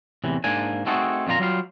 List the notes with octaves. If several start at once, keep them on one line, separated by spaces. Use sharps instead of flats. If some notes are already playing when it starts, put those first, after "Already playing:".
E2 A2 C3 E3
G#2 A#3 D4 G#5
A3 C4 D#4 F#4 G#4 A4
F2 A#2 F4 F#4 A#5
F#3 G3 F4 F5